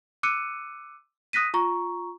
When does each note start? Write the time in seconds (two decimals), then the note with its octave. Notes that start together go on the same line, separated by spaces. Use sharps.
0.23 D6 E6 F#6 C#7 D#7
1.33 D#6 F#6 A#6 B6 D#7
1.54 F4 A#5 C#6